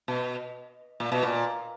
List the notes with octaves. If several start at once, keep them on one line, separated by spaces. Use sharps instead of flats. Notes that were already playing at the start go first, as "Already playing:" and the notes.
B2
A#2
B2
A#2